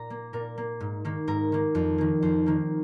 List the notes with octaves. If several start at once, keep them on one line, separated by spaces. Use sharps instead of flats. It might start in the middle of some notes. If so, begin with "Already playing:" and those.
Already playing: A#2 A#5
A#3
A#2 A#4
A#3
G#2
D#3 A#3
G#2 A#4
D#3 A#3
F2
D#3 A#3
F2 C5
D#3 A#3